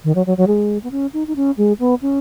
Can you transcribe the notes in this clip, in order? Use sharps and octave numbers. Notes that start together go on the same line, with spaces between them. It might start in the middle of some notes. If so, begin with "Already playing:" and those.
D#3
F#3
F#3
F#3
G#3
B3
C#4
D#4
D#4
C#4
G#3
B3
C#4